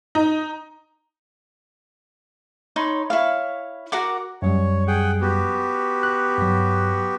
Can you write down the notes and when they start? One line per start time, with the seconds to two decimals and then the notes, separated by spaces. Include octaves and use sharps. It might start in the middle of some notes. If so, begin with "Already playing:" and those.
0.15 D#4
2.76 D#4 C#5 B5 C6
3.10 E4 C#5 F5
3.92 F#4 A#4 F#5 D6
4.42 F#2 F#3 G3 C#5
4.87 G#4 F#5 G5
5.21 B3 F#4 G4
6.03 F#6
6.38 G2 F#3